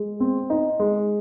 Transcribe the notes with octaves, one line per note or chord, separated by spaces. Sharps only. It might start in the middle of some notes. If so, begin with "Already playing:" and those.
Already playing: G#3
C4
D#4
G#3